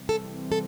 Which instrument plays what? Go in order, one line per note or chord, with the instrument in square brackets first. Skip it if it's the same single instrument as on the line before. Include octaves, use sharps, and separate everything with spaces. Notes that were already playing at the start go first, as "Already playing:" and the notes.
Already playing: [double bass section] C3 E3 G3 C4
[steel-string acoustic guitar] A4
A4